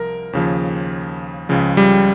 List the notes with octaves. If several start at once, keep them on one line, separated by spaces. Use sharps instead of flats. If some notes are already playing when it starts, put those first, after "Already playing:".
Already playing: C2 F3 A#4
D#2 C#3 F3
C#2 C#3 F3
G3